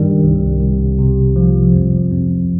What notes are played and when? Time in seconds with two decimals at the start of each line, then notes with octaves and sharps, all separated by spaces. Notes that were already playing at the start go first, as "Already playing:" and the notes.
Already playing: G2 D#3 G3 D4
0.24 C2
0.61 C2
0.99 C3
1.36 F3
1.73 F2
2.11 F2